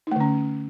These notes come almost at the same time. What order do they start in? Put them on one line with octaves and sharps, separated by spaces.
D#4 A3 D3 C#4